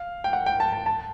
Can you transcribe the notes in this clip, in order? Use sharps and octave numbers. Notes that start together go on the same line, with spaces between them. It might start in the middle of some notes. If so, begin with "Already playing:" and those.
Already playing: F5
G5
F#5
G5
A5
A5
A5